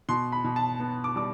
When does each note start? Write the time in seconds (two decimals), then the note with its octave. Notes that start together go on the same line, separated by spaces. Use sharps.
0.09 B2 C6
0.32 B5
0.44 B2
0.56 A5
0.80 B3
1.04 D6
1.16 G3 D6